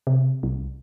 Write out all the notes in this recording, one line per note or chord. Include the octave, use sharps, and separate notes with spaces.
C3
C2